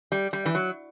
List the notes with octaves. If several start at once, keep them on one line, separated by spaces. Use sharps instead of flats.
G3
G3
E3
F#3